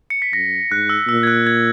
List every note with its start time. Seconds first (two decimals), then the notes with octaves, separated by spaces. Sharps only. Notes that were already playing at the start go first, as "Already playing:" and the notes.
0.10 C#7
0.22 B6
0.33 F#2 A#6
0.71 G#2 F#6
0.89 E6
1.08 A#2 E6
1.23 G#6
1.27 F#6
1.47 G#6